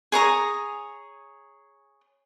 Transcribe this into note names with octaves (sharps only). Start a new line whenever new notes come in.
G#4 C#5 A#5 D#6